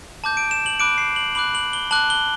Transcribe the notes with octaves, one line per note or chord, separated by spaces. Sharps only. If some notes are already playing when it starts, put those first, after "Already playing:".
A5 D6 G6
D7
E7
F#7
B5 D6 F#6 D7
C7
F#7
B5 D6 F#6 F#7
F#7
G7
A5 D6 F#6 F#7
G7